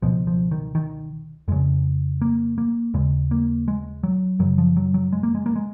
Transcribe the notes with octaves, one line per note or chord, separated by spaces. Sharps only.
C#2 B2 F3
F3
D#3
D#3
F2 C#3 G#3
A#3
A#3
D#2 C#3 G#3
A#3
G#3
F#3
F#2 C#3 F#3
F3
F#3
F#3
G#3
A#3
G#3
A#3
G#3